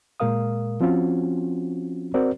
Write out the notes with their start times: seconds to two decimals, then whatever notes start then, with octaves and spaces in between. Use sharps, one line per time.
0.20 A#2 G#3 A#4 F5 D#6
0.81 F3 C4 C#4 F4 F#4
2.14 C4 F#4 A#4 C5 D5